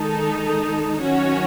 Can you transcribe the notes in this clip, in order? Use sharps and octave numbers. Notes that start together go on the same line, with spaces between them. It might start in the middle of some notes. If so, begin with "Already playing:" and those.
Already playing: D#3 G#3 D#4 A4
D#3 F#3 C#4 F#4 C#5